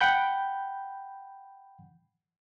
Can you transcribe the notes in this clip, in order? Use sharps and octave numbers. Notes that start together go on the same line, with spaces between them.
F#5 G5 B5 G6